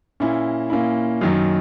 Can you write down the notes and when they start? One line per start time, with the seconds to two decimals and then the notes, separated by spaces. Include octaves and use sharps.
0.20 A#2 A#3 C#4 E4
0.70 A#2 A#3 C#4 E4
1.21 F#2 D#3 F#3